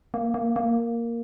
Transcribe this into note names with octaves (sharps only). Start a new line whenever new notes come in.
A#3
A#3
A#3